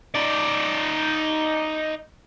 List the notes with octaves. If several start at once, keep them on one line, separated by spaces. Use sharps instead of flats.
D#4 D5